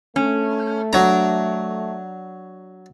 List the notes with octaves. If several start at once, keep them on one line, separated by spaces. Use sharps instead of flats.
A3 C#4
F#3 D4 A#5